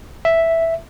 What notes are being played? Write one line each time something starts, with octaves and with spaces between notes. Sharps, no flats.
E5